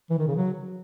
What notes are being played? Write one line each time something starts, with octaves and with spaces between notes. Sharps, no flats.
E3
D#3
C#3
F#3